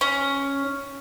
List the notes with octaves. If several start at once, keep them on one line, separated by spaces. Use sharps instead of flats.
C#4